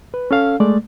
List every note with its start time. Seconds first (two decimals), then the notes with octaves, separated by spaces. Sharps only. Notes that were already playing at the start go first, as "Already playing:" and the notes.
0.14 B4
0.31 C#4 A4 F5
0.60 G#3 A3 D5